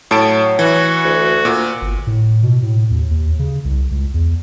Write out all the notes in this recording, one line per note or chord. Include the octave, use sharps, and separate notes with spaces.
A2 F#3 A5 D7
E3 F#4
D2
A#2
G1
A2
B2
A2
D#2
D#2
C#3
C2
C#2
E2